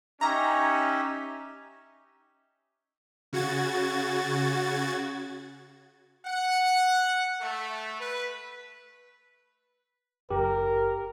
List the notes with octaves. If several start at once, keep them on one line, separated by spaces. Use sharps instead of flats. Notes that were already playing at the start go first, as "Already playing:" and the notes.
C#4 D#4 G4 E5 A#5
C#3 F#4 G#6 A6
F#5
A3
B4
F#1 G4 A#4